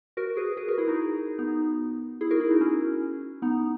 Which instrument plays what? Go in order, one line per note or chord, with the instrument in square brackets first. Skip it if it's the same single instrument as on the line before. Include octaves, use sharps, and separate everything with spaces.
[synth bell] F#4 A#4
G#4 B4
G#4 B4
F#4 A#4
E4 G#4
D#4 F#4
B3 D#4
E4 G#4
F#4 A#4
E4 G#4
D#4 F#4
C#4 E4
B3 D#4